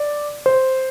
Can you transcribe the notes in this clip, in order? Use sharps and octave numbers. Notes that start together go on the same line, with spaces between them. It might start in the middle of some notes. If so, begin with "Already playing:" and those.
Already playing: D5
C5